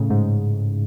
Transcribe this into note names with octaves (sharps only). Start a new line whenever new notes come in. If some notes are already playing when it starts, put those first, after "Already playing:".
Already playing: A2 C#3
G#2